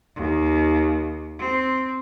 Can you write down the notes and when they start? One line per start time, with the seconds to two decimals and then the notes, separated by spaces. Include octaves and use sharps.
0.16 D#2
1.39 C4